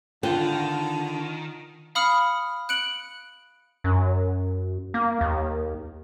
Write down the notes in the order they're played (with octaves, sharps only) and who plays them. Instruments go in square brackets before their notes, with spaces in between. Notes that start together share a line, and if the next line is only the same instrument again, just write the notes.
[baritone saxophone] D3 [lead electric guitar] D#3 [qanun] F4 F#5 [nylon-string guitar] G5
[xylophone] F5 B5 D#6 F6 C#7
F#6 C#7 D7 F#7
[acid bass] F#2
A#3
D#2